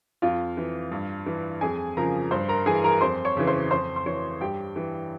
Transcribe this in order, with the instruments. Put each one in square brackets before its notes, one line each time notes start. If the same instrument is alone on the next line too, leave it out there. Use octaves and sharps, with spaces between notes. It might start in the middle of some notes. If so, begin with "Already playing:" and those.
[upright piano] F2 F4 F5
E3
G2
E3
F2 G#4 G#5
C#3 F3 A#4 A#5
G2 C5 C6
A#4 A#5
E3 G#4 G#5
A#4 A#5
F2 C5 C6
C#5 C#6
C#3 E3
C5 C6
F2 C5 C6
C6
E3 C#5 C#6
G2 G4 G5
E3